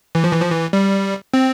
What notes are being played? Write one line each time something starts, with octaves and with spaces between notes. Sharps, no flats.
E3
F3
E3
F3
E3
G3
C4